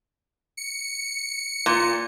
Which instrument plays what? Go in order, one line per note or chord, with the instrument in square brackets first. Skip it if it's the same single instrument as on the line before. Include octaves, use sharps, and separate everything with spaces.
[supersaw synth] C#7
[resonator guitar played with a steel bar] A#2